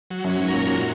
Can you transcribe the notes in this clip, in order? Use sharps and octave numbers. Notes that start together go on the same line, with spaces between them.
F#3
F#2
C#4
G#2
A#2 A#4
A#2 F#3